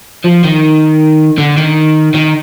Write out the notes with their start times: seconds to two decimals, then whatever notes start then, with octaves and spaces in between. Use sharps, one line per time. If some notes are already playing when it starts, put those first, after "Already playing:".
0.24 F3
0.44 D#3
1.38 D3
1.57 D#3
2.14 D#3